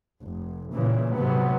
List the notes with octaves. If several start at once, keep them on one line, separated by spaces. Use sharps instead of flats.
F1
A#2 C#3 E3
G#2 C3 F#3 B3